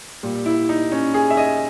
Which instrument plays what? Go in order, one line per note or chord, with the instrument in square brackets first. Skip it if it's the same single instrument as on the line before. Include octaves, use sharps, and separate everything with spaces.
[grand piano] A#2 G3
E4
D#4
C#4
G#4
E5
D#5